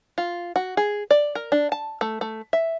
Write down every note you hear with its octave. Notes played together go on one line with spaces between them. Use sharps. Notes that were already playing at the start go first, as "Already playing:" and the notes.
F4
F#4
G#4
D5
A#4
D4
A5
A3
A3
E5